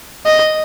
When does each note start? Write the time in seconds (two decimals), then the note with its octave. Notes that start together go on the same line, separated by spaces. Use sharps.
0.26 D#5